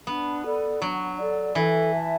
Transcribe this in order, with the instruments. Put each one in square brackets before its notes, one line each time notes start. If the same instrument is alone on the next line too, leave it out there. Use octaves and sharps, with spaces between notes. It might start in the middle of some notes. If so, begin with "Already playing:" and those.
[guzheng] B3 [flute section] D4
[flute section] A4 D5
[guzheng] F#3 [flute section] D4
[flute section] A4 D5
[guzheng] E3 [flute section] A4
[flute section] E5 A5